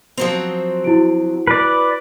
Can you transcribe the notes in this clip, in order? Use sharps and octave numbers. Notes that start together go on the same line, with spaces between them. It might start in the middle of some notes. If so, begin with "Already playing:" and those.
F3 F#3 C4
E4 F#4 D7
B4 D5